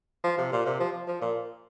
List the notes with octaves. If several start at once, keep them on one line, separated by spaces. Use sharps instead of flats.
F3
C3
A#2
C3
F3
F3
A#2